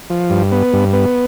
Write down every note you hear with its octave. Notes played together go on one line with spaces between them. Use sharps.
F3
G2
B3
G2
B3